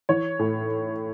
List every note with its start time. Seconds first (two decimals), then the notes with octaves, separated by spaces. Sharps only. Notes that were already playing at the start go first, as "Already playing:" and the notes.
0.09 E3 C#5
0.39 A2